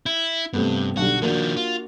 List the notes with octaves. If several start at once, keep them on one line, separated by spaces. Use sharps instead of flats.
E4
G2 C3 A3 B3
B1 D3 G3 F#4
D#3 F3 A#3 D4 F#4
F4